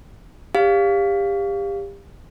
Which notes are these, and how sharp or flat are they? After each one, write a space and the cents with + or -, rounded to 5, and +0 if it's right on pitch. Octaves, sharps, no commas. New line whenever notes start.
G4 +25 C#5 +40 F5 +0